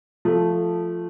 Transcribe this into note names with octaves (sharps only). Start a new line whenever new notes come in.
F3 A3